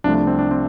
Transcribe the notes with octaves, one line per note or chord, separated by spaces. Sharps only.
C2 C3 F3 A3 D4
D4
C4
D4
C4